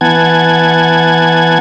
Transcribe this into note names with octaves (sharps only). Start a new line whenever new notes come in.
E3 B3 F#5 G#5 A5 G#6